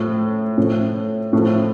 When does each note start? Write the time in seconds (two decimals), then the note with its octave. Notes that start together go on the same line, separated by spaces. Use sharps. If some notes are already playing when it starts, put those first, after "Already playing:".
Already playing: A2 F3
0.58 A2 F3
1.33 A2 F3